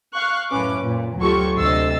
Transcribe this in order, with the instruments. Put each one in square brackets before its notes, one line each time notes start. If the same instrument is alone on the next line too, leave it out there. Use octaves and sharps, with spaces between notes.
[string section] F5 C#6 F#6
F#2 A2 C#4 B4 D6
A#2
D2 F#3 F4 G4 A4 C#6
D2 C3 D#5 E6 A6 C7